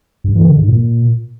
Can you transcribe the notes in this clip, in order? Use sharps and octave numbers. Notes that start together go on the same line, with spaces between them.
G2
E3
D3
G#2
A#2